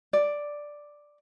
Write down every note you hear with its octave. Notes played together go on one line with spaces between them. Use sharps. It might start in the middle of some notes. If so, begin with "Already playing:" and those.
D5